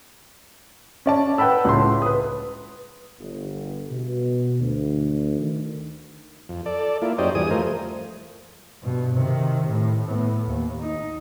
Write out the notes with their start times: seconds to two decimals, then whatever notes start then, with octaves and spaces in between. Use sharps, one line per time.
1.06 C#4 D5 A5
1.38 B4 F#5 G5 A5 B5 E6
1.65 C#2 A2 C6
2.02 B4 D#6
3.19 G1
3.91 B2
4.60 D2
5.39 D#3
6.49 F2
6.66 A4 D5
7.02 A#3 E4 F4
7.18 F#2 C#4 G4 C5 D5 D#5
7.35 E2 G2 G#4 D#6
7.51 F3 A3 A#4 C5
8.82 G2 B2
9.15 C3 D#3
9.67 A2
10.05 A2 B3
10.48 D#2
10.81 D#4